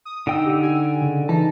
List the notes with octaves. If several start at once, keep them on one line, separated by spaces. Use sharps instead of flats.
D#6
D3 D#4 G5 E6
G4
G#5
C#3
E3 D#4 A5